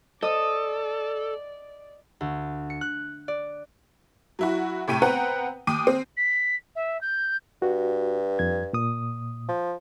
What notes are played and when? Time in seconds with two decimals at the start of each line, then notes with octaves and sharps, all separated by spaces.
0.23 A4 D5 D#5 D#6
2.21 D2
2.70 C#7
2.81 F#6
3.28 D5
4.39 F#3 E4 F#4
4.88 A2 C3 G5 D#7
5.02 B3 C4 B4 F#5 G5 A#5
5.67 D#2 G5 D6 D#6 D#7
5.87 C4
6.17 B6
6.75 E5
7.01 G6
7.62 G2 F#4
8.39 F2 G#6
8.73 A#2 D#6
9.48 F3